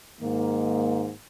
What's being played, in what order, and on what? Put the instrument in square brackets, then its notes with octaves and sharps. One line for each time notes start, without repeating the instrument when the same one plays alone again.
[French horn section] G#2 D#3 A#3